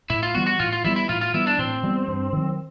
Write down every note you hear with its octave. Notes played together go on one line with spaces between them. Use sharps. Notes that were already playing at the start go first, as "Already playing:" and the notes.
A2 E4
F4
E3 G3 B3 F#4
F#4
A2 F4
F4
E3 G3 B3 E4
E4
A2 F4
F4
E3 G3 B3 E4
D4
A2 C4
E3 G3 B3
G2
D#3 F#3